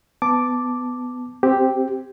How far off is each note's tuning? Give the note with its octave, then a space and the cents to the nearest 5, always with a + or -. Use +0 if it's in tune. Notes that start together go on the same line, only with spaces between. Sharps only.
B3 +20 A5 +0 D6 +0
C4 +0 G4 +0